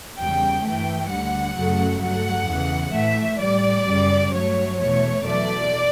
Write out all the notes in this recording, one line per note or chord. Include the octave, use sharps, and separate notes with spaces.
E2 C#3 G3 G5
G2 E3 A3 G5
D2 D3 G3 F#5
F#2 C#3 F#3 A3
G2 F#3 A3 F#5
E2 C#3 E3
A2 E3 A3 E5
A2 G3 D5
F#2 C#3 G3
G2 F#3 A3 C#5
E2 B2 A3 C#5
E2 B2 F#3 A3 D5